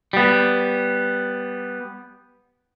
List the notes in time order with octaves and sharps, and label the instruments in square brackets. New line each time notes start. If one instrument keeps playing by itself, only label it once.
[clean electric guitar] G3 B3